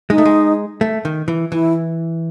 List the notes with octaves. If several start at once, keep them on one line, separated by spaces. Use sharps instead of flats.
G#3 D#4
A3
G#3
A3
D#3
E3
E3 E4